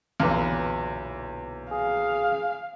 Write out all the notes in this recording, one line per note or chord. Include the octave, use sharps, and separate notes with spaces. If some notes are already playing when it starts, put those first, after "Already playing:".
B1 E2 A#2 D3 B4
G#4 F5